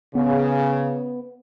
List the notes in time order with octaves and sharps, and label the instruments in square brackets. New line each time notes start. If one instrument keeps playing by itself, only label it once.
[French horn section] C#3 [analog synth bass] B3